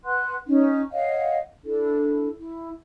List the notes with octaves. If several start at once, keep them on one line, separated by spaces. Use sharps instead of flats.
B4 F#5 C6 F#6
C#4 D#4
C#5 D#5 F5 F#5
D4 E4 A4
E4